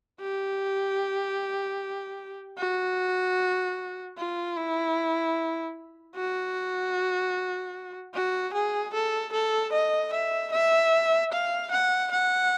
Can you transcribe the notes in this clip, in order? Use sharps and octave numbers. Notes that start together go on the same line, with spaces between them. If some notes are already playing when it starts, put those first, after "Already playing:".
G4
F#4
F4
E4
F#4
F#4
G#4
A4
A4
D#5
E5
E5
F5
F#5
F#5